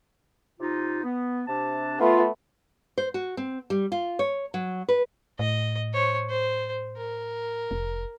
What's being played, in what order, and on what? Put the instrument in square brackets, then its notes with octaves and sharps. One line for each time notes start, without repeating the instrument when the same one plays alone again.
[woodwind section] C3 D#4 F4
B3
C3 D4 A5
[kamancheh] A3 B3 [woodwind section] F4
[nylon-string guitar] C5
F#4
C4
G3
F4
C#5
F#3
B4
[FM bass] A2 [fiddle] D#5
[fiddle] C5 C#5
C5
A#4
[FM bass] F1